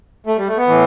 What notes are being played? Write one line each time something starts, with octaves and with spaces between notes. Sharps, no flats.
A3
G3
A3
B3
A2 E3